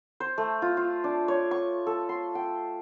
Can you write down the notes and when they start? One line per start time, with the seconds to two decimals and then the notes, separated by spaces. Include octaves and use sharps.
0.20 C5
0.38 A3
0.62 F4
0.77 F4
1.04 D4
1.28 C#5
1.51 C#6
1.87 A4
2.09 C6
2.35 G5